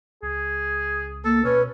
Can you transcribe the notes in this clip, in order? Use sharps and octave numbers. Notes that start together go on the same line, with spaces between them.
C#2 G#4
A#3 A4
B2 C#4 B4